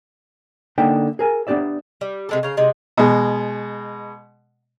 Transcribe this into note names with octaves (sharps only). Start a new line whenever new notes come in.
D3 A#3 D#4 E5 F#5 G5
G#4 A#4 G#5
B3 D4 G4 D5 E5
G3
C3 G#3 A4
C#3 F5 A#5
C3 G#3 D#4
B2 G#3